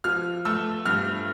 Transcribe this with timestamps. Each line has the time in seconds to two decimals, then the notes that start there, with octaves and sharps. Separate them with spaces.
0.04 F3 F6
0.45 A3 E6
0.85 G2 F6